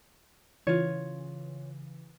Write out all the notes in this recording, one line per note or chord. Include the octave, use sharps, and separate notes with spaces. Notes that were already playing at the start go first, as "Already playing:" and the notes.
C#3 E3 F4 C#5